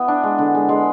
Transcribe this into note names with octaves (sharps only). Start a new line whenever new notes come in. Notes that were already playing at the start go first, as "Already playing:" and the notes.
Already playing: B3 E4
D4
G#3
D3
G#3
G#3